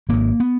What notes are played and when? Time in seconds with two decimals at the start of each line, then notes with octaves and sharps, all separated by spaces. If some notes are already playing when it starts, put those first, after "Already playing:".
0.09 G#1 G#2 A#3
0.40 B3